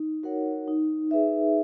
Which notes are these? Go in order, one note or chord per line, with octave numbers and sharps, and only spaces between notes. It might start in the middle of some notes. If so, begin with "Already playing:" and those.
Already playing: D#4
F#4 A#4 C#5 F#5
D#4
G#4 B4 E5